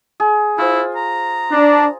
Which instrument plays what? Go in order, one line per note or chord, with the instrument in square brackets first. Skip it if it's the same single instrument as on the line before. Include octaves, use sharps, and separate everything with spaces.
[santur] G#4
[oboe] E4 [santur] F4 C5
[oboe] A#5
[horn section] D4